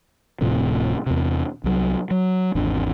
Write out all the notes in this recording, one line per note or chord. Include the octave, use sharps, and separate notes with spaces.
D1 A2 C3 F3
E2 C3
C2 F#3
F#3
G#1 E2 C4 D4